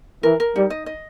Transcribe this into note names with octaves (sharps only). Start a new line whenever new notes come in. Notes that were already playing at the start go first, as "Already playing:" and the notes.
E3 A#4
A#4
G3 D#4
D#5
D#5